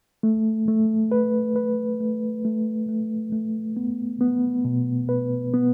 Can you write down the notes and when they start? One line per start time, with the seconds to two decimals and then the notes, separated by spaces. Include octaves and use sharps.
0.23 A3
0.68 A3
1.12 B4
1.56 B4
2.01 A3
2.45 A3
2.89 A3
3.32 A3
3.77 B3
4.21 B3
4.65 B2
5.09 B4
5.54 B3